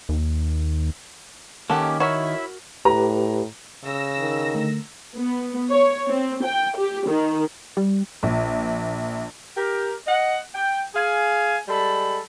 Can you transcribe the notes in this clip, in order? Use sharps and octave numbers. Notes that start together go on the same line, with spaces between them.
D#2
D#3 A#3 C#4 G4 A4 F#5
E4 F#4 A#4 C#5 E5
A2 G4 B4 A#5
C#3 E6 A#6
D#3
D3 A3 A#4
B3
C#5
C4
G5
G4
D#3
G3
A#1
G4 A#4
D#5 F#5
G5
G#4 F5 G#5
G3 G#3 A4 B5